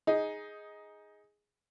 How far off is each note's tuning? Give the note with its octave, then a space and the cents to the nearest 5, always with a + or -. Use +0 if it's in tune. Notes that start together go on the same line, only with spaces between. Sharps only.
D#4 +15 G#4 +0